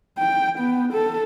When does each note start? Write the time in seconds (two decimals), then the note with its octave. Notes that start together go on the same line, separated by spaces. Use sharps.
0.18 G5
0.59 B3
0.93 A4